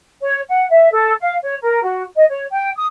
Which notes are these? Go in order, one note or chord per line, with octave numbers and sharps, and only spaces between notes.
C#5
F#5
E5
A4
F5
C#5
A#4
F#4
D#5
C#5
G5
D#6